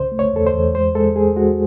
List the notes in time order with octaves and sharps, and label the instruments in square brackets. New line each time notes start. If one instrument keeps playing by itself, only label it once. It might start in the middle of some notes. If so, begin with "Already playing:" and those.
Already playing: [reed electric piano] C#2 C#3 C5
A3
C#5
E2 A4
C5
E2
G#3 C5
G#3 A4
G#3 G#4
G#3 F#4